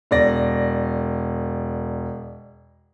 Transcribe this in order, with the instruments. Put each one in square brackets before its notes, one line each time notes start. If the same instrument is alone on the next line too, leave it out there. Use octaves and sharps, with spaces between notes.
[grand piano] E1 D5 A#6